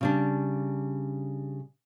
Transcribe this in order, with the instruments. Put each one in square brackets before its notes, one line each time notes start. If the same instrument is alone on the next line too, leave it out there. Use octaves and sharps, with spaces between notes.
[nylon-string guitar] C#3 G3 D4